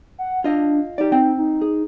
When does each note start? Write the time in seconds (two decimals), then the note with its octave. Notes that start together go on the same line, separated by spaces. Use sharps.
0.19 F#5
0.44 D4 F4 D#5
0.98 D#4 G4 D5
1.12 C4 G5
1.38 D#4
1.62 G#4